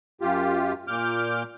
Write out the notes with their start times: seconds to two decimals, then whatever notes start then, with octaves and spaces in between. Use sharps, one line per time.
0.21 F#2 F4 G4
0.88 A#2 D6 F6 G6